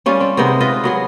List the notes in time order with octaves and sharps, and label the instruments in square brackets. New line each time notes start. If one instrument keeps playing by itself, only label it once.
[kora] G3 C#4 F4
C4
C3 G#3 B3 D#4
F4 B4 D#5
F#3 B3 G#4